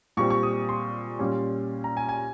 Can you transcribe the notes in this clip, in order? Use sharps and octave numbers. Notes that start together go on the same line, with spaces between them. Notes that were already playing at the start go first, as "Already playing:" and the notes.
A#2 G3 C4 C#6
C#6
D#6
C6
A#2 G3 C#4
A#5
G#5
G#5